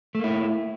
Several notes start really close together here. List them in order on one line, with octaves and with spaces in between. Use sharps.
A3 A#3 E4